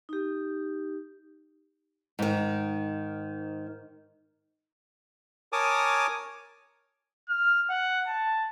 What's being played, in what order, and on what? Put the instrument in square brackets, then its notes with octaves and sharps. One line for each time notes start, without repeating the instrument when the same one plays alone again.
[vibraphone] D#4 G4
[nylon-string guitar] G#2 D#3
[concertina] A#4 C#5 G#5 A5 D6 D#6
[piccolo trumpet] F6
F#5
A5